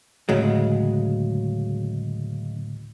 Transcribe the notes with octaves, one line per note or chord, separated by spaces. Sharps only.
D2 A2 C#3 F#3 G#3